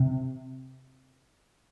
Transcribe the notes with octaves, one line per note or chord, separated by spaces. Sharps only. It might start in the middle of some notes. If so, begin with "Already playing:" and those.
Already playing: C3